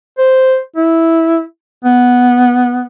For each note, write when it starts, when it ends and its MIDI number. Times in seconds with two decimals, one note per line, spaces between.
0.18 0.58 72
0.76 1.41 64
1.84 2.82 59